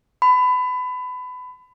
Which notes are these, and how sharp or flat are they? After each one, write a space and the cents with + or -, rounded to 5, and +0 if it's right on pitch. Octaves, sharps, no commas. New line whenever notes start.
B5 +25